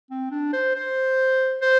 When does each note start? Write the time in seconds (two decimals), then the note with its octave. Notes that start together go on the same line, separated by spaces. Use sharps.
0.11 C4
0.31 D4
0.53 C5
0.75 C5
1.62 C5